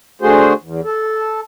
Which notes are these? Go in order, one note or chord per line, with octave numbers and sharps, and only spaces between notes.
D3 A3 F#4 G#4 C5
E2
A4